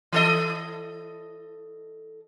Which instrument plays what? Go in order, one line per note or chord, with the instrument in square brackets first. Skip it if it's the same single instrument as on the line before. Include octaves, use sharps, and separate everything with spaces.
[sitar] E3 A4 D#5